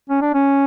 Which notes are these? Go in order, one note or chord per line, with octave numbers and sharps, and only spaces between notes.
C#4
D4
C#4